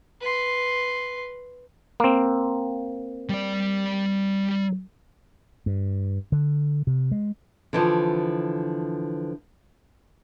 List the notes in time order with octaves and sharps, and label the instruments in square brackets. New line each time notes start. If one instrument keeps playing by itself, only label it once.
[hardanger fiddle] B4 C6
[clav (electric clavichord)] A#3 C4
[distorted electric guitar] G3 D5
[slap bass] G2
D3
C3
G#3
[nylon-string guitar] D3 E3 F3